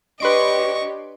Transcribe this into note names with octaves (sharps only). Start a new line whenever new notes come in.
D4 G4 B4 C#5 D#5 C6 C#6 D7